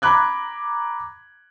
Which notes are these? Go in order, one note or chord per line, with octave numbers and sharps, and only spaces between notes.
A#5 B5 D6 F#6 G#6